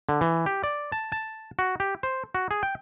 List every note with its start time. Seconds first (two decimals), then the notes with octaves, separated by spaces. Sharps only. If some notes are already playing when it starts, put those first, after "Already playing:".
0.09 D3
0.21 E3
0.46 G4
0.63 D5
0.92 A5
1.12 A5
1.59 F#4
1.80 G4
2.03 C5
2.35 F#4
2.51 G#4
2.63 G5